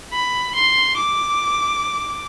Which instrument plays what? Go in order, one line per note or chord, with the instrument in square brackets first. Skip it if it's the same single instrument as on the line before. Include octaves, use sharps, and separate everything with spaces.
[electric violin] B5
C6
D6